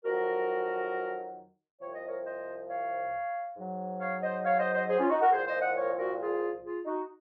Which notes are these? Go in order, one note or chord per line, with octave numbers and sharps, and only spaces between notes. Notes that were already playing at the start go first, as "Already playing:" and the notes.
F2 D#3 F#3 F#4 A#4
C2 C3 F3 C#5
D#5
A#4 C#5
C5 D#5
C#5 F5
G#2 F#3
C#5 F5
C5 D#5
C#5 F5
C5 D#5
C5 D#5
G#4 C5
C#4 F4
D#4 F#4
F#4 A#4
C2 A#2 F3 G#4 C5
C5 D#5
D#5 F#5
A#4 C#5
F#4 A#4
F4 G#4
F4 G#4
D#4 F#4